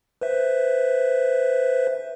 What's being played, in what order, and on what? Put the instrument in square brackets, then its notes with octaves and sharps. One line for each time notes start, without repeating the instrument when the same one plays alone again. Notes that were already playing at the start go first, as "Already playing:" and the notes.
[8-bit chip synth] B4 C5 E5